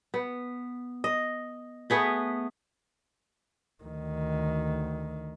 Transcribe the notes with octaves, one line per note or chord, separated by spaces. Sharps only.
B3
D#5
A3 B3 G#4 B4
D2 D#3